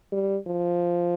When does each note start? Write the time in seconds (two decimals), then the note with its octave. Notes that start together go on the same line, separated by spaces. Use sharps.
0.12 G3
0.47 F3